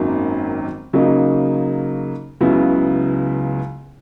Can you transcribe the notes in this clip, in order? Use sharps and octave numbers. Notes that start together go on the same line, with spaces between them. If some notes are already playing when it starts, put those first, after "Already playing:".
Already playing: G#1 F#2 D#3 F#3 A#3
C#3 F#3 A#3 D#4
C#2 C#3 F#3 B3 E4